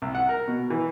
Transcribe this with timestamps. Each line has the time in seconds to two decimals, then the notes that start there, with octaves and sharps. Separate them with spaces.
0.02 C2
0.15 F#5
0.29 A#4
0.48 B2
0.70 E3